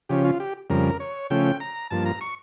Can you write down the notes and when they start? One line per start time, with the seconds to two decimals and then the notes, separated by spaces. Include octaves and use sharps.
0.09 C#3 F3 C#4 G4
0.25 F4
0.40 G4
0.70 F2 C#3 G3 A#4
1.00 C#5
1.30 C#3 F3 A3 C#4 G5
1.60 A#5
1.90 G2 F3 A#3 A5
2.06 A#5
2.21 C#6